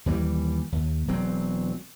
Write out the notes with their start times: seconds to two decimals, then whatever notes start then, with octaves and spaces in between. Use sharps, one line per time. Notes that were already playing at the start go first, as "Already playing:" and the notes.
0.06 D#2 E3 F3 G3
0.72 D#2
1.08 E1 F#3 C4